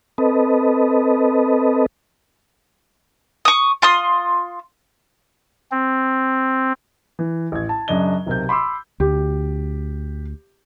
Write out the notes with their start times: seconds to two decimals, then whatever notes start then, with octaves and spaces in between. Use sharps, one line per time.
0.18 C4 A4 B4 D#5
3.45 C#6 D#6
3.82 F4 C6 D#6
5.71 C4
7.19 E3
7.52 A1 G#6
7.69 A5
7.88 F#2 C#3 D4 D#5 G7
8.26 B1 C3 A#4 C5 G6
8.49 B5 C6 D6 E6
9.00 D2 G4